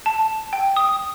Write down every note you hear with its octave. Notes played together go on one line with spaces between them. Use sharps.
A5
G5
D#6